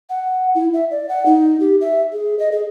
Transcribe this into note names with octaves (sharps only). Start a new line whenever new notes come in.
F#5
E4
E5
D5
F#5
D#4
G4
E5
G#4
D#5
G#4